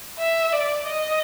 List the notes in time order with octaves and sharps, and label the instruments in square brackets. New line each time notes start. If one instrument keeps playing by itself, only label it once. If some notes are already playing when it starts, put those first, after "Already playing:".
[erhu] E5
D5
D#5